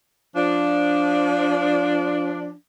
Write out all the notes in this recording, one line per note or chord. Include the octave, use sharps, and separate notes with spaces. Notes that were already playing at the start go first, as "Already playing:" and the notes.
F3 D4